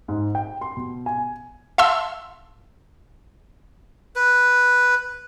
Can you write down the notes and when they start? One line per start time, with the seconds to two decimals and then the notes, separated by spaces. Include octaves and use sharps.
0.08 G#2
0.35 G5
0.61 C6
0.77 B2
1.06 G#5
1.78 E5 F5 A5 C6 E6
4.16 B4